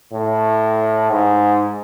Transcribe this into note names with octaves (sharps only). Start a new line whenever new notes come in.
A2
G#2